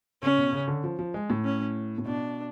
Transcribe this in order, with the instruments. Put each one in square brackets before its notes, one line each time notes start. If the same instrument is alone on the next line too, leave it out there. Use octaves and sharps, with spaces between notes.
[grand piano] C#3 [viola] C#4
[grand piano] B2
C#3
D3
F3
F3
G#3
A2
[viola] C#4
[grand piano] A2
[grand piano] B2 [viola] D4